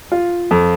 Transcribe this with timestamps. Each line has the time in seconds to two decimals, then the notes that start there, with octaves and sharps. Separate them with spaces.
0.12 F4
0.51 F2